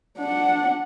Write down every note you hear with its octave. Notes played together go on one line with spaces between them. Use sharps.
D4 F#5